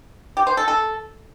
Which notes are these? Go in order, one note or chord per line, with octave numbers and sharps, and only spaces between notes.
G4
C5
A4
A4